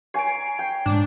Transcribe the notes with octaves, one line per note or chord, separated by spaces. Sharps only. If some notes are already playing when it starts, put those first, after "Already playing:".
C#5 G#5 A#5 C7 D7
G5
G#2 D4